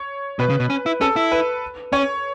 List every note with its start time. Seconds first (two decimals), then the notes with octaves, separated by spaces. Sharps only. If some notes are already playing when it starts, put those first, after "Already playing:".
Already playing: C#5
0.39 B2 B4
0.50 C#3
0.60 B2
0.70 C#4
0.86 E4
1.01 C#4 A4
1.16 E4
1.32 B4
1.92 C#4 C#5